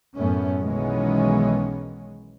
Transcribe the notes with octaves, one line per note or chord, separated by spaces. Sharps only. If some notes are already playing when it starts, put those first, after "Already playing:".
F#2 A2 A3 B3 C#4
B1 D#3 E3 G#3 B3 C#4